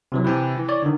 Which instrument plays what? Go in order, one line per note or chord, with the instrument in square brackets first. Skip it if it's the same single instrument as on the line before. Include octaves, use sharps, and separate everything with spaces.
[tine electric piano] C3 E3 F#3
[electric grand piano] C3 E3 E4 [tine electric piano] B4 G5 G#5
[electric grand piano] E3
[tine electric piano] C#5 D5
D3 D#3